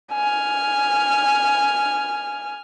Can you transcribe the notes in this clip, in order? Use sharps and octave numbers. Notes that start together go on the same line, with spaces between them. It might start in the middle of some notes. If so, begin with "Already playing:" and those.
G#5 F6